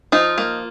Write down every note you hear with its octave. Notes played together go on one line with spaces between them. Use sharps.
F3 D#4 F4
A#3